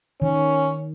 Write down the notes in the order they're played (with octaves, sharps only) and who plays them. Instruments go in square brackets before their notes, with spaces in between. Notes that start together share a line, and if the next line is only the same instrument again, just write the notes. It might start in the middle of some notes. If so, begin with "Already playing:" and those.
[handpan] D#3 [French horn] C#4